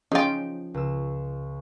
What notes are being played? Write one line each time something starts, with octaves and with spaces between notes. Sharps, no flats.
F3 C#4 D#4 F4 G#4 G5
C#2 E6